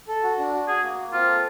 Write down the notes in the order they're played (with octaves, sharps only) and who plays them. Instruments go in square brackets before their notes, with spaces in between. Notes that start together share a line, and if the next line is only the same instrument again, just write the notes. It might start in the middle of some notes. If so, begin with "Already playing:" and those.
[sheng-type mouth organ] A4
F#4
D4
F#4
[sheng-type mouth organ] F#4 [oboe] G#4
[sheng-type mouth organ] A#3
A#3
[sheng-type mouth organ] C4 [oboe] F4
[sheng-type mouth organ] A4